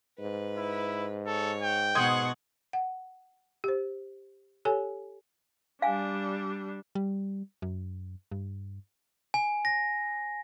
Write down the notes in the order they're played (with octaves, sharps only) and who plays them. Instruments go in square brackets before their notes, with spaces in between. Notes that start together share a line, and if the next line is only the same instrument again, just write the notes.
[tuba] G#2 [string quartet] B4
[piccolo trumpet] E4
[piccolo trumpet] A4 [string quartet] C#5
[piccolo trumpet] G5
[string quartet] B2 F#5 C#6 [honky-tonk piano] C6 D#6 G#6
[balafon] F#5
G4 C5
G4 A4 C#5 G#5
[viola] G3 D4 [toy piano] F5 G#5
[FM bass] G3
F#2
G2
[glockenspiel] G#5
A#6